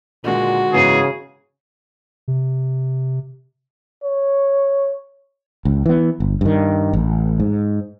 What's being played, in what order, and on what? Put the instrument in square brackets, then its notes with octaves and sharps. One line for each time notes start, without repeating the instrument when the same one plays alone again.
[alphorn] A#2 [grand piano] D3 D#3 G#3 [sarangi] F#4
[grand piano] G#2 E3 B3 [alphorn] C#3 [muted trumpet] G#4
[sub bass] C3
[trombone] C#5
[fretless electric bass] C#2
E3 B3
G1
G2 D#3
A1
G#2